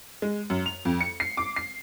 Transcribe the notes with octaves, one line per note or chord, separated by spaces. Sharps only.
G#3
F#2
F7
F2
C#7
C7
D6
C7